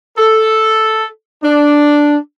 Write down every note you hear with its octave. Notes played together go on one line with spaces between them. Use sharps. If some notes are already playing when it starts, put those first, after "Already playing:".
A4
D4